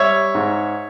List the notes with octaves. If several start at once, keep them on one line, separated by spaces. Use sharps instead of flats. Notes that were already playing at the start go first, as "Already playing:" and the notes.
Already playing: G3 C#5 E5
G#2